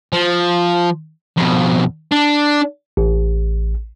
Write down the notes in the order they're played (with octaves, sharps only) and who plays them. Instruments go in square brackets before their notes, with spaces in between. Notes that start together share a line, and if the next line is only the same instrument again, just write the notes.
[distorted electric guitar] F3
F2 B2
D4
[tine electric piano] A1